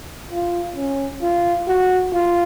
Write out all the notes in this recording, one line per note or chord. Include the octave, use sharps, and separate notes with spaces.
F4
C#4
F4
F#4
F4